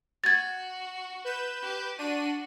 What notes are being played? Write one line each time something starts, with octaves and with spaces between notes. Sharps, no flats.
F#4 G#6 A6
B4 G6 E7
G4
D4 F#4 D#7